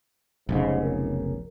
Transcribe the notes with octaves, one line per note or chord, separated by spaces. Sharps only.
F1 B1 G#2 C#3
A#4